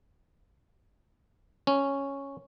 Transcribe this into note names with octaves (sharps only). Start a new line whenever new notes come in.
C#4